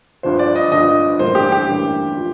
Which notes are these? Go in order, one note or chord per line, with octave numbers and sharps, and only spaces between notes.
G1 G2 D3 F3 C5
D5
D#5
G1 G2 D3 F3 D#5
A1 G2 D3 G3 A#3 C5
G4
G4
A1 G2 D3 G3 A#3
F3